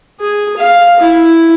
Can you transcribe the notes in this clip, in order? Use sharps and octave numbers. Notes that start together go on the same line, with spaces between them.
G#4
F5
E4